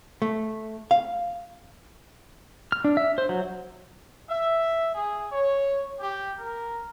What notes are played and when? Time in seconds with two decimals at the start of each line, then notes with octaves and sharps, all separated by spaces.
0.22 A3
0.91 F5
2.72 F6
2.84 D4
2.97 E5
3.18 C5
3.29 F#3
4.28 E5
4.94 G#4
5.32 C#5
5.99 G4
6.39 A#4